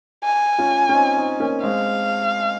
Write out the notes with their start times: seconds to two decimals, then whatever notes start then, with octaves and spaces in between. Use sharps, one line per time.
0.24 G#5
0.58 C#4 F4
0.89 C#4
0.94 C4 D#4
1.17 C4 D#4
1.40 A#3 C#4
1.63 G#3 C4 F5